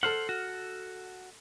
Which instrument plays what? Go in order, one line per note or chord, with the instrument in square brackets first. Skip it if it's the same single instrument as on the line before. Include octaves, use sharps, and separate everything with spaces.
[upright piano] A4 F6 [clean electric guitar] C5 F#5
[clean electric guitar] F#4